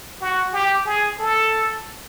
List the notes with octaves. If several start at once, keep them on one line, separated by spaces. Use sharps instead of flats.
F#4
G4
G#4
A4